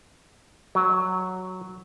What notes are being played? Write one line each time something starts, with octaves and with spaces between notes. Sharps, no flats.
F#3